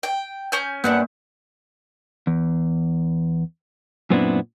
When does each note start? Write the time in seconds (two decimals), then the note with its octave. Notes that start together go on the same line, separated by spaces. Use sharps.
0.03 G5
0.52 C#4 G#5 G6
0.84 G2 A#3 B3 D4 F#5
2.27 E2
4.10 F#2 A#2 B3 C4 D4 E4